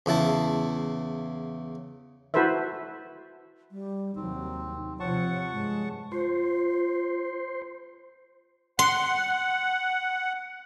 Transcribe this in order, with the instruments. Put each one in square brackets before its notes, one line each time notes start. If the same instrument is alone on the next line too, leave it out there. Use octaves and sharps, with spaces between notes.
[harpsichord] E2 C#3 E4 A5
[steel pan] E4 F#4 A4 B4 C5 E5
[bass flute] G3
[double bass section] D#2 C3 F#3 [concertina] C4 [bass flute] D#4
[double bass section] C3 F3 [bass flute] C#5 [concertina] F#5 A5 C#6
[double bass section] G2 [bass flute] G#3
[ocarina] F4 [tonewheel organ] C5
[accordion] F#5 [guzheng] C6